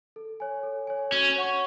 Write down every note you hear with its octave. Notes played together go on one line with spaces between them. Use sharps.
A4
C#5 G#5
A4
C#5 G#5
C#4 F#4
C#5 F#5 C#6